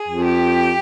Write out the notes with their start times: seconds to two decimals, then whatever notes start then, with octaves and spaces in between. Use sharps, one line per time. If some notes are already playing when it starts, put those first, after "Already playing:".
Already playing: G#4
0.08 F2
0.25 G4